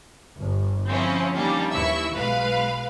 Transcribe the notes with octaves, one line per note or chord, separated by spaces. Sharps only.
G1
F3 C4 C#4 E4
D#3 F3 G3 A#3 C#4 D4
D#2 E3 E4 E5 C#6 E6
B1 G#3 B4 F5